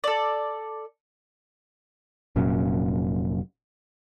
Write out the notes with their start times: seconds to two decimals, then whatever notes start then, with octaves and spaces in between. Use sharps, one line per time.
0.04 A4 D5
2.36 F1 A#2 F#3 C#4